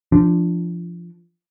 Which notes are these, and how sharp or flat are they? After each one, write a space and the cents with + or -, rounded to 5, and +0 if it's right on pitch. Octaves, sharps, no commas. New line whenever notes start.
F3 -20 D4 +0